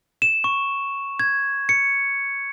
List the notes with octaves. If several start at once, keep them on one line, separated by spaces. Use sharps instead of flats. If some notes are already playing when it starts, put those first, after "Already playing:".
E7
C#6
G#6
C#7